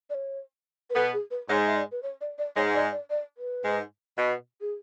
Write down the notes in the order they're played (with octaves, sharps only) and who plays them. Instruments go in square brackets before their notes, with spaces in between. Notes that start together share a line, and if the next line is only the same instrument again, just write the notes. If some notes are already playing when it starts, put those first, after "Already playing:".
[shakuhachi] D5
C#5
B4
[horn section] B2 B3 [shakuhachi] A4
[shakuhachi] G#4
B4
[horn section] G#2 G#3 [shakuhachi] C#5
[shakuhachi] E5
D5
B4
C#5
D5
D5
[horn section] G#2 G#3 [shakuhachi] C#5
[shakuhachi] D5
D5
D5
B4
[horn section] G#2 G#3
B2
[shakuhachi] G#4